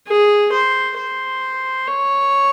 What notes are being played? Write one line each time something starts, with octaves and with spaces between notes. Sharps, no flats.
G#4
C5
C5
C#5